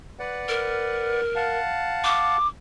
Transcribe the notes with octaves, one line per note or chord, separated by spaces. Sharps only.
B4 D5 F#5
A#4
F5 F#5 A5
D6